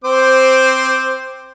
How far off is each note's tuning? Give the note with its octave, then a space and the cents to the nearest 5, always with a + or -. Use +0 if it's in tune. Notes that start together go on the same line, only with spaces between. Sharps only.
C4 +0 C5 +0 D6 +0